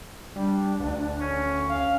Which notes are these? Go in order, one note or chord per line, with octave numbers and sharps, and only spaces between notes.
G3 D4
D2
C#4
C#4 F5